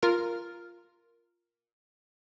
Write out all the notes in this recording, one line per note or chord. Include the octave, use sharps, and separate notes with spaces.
F4 A#4 F6